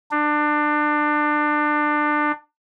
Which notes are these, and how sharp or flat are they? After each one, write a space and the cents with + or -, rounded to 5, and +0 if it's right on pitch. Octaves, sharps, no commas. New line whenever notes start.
D4 +25